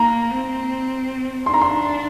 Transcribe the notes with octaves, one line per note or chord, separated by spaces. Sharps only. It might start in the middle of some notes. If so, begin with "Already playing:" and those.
Already playing: A#3 A#5
C4
D4 C6
A#5
C6